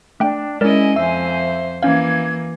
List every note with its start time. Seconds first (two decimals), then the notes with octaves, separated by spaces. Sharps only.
0.20 A3 D4 G5
0.61 G#3 C#4 E4 A#4 D5 D#5 G#5
0.96 F2 C5 E5
1.83 E3 A#3 C#4 F5 G#6